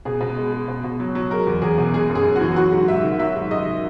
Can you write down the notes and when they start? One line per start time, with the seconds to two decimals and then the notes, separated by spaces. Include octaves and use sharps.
0.05 B2 G#4
0.20 B2
0.37 G#3
0.52 G#3
0.68 B2
0.84 B2
1.00 F#3
1.15 F#3
1.31 G#3 A#4
1.47 E2
1.62 E2 G#4
1.78 B2
1.94 G#3 G#4
2.09 F#2
2.15 G#4
2.25 F#2
2.36 F#4
2.41 E3
2.56 F#3 F#4
2.72 G#2
2.88 G#2 E5
3.04 D#3
3.19 F#3 E5
3.35 G#2
3.51 G#2 D#5
3.66 D#3